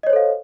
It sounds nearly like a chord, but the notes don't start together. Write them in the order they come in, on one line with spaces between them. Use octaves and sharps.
D#5 C#5 C5 A4 F5